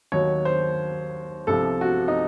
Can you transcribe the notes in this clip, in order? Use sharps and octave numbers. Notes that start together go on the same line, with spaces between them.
D#2 D#3 F#3 C#5
C5
C2 C3 F3 A4
F#4
D#4